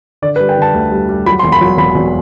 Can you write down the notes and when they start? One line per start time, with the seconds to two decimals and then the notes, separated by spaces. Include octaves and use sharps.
0.22 D3 D5
0.36 B4
0.40 G3
0.49 G5
0.57 D3 A5
0.74 D2
0.92 G3
1.09 G3
1.26 F#3 B5
1.39 C6
1.43 E1
1.52 B5
1.61 F#3
1.78 E1 B5
1.95 E1